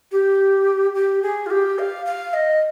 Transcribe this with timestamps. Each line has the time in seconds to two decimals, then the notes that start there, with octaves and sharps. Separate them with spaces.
0.12 G4
0.95 G4
1.23 G#4
1.46 F4
1.50 G4
1.79 F5
2.06 F5
2.34 D#5